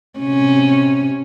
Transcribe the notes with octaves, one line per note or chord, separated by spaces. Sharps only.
C3 C#4